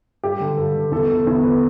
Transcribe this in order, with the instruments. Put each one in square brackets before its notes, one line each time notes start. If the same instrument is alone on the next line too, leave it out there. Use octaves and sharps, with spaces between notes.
[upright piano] G2 G4
D3
G2 A4
D3
E2 A4
D3 A4
E2
D3 B4